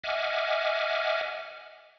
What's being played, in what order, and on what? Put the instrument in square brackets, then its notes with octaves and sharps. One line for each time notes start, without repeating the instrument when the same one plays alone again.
[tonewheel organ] D#5 E5 F#5 G#5 D6 F6